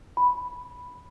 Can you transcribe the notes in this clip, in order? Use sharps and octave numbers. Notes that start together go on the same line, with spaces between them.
B5